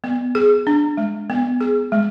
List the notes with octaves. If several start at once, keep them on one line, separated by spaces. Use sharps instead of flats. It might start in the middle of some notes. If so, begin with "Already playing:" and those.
B3
G#4
D4
G#3
B3
G#4
G#3